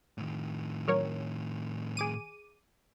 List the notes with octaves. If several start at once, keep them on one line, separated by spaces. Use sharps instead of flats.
A2 D#3
F#3 A#4 C#5
G#4 D6 D#7